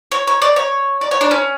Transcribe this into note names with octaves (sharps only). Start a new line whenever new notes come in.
C#5
C#5
D5
C#5
D5
C#5
D4
C#4